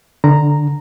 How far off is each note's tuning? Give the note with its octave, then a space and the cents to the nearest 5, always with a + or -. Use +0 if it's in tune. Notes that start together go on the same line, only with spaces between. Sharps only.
D3 +0 A#5 -5